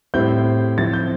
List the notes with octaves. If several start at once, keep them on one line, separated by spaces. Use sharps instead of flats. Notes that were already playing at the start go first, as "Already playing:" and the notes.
A2 G3 C4 E4 G6
F3 C4 E4 A6
G6